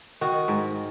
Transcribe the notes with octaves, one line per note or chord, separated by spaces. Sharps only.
D#3 F#4
G#2